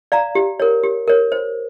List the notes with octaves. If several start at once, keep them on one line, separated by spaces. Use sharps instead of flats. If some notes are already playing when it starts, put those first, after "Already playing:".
D5 F5 A#5
G4
A#4 C#5
G4
A#4 C#5
C5